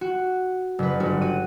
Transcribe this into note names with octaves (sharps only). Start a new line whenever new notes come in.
F#4
F#1 B4
G1 F#4
F#4 D#7